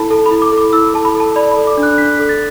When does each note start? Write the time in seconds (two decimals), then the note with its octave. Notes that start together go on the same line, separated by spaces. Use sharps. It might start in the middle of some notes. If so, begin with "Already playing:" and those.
Already playing: E4 A4 A5 B5
0.10 A4 A5
0.26 B5
0.31 E4
0.42 D6
0.52 A4
0.58 D6
0.73 E4 E6
0.94 A4 A5
1.05 B5
1.15 A4
1.20 A5
1.36 D5 B5
1.51 B5
1.57 A4
1.67 D6
1.78 D4
1.83 F#6
1.98 D4 B6
2.19 A4
2.29 A6